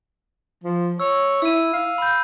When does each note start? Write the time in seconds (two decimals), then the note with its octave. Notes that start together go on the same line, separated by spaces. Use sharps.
0.64 F3
1.00 C#5 E6
1.42 E4 E6 D#7
1.73 F5
1.98 B5 G6